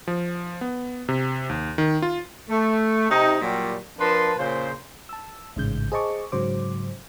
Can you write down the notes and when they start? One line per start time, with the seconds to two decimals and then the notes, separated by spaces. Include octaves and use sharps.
0.07 F3
0.61 B3
1.09 C3
1.49 D#2
1.78 D#3
2.02 F4
2.49 A3
3.10 C3 D#4
3.41 A#2 F#3 G3
3.99 F3 D4 A#4 B4 A5 C6
4.37 A#2 C#3 C5
5.09 A5 E6
5.56 A1 G#2 C#3 G6
5.92 G#4 C5 D#5 A5 C#6 D6
6.32 G#2 C#3 F#3 C5 D6